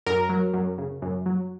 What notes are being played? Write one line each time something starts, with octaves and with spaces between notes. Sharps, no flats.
F#2 A#4
F#3
F#2
C#3
F#2
F#3